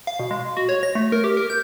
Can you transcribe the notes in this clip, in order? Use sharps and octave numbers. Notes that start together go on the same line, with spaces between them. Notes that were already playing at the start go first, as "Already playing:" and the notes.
F5
B2
G#3
F#4
C#5
A#6
A3
A#4
G4
A#4
G6